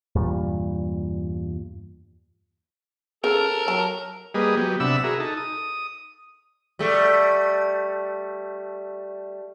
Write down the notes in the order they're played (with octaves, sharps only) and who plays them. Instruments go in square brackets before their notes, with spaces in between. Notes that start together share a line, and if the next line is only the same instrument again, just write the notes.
[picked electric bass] E2 G2 A#2 G3
[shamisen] C#3 [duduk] A4 [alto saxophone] A#4
[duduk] F#3 [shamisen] A5
[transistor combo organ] G3 A#3 G#4 B4 D#5
F#3 B3 G4
C3 D4 E5 F#5 B5 E6
F#4 G#4 A#4 E5
D#4 A4
D#6
[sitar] G3 A3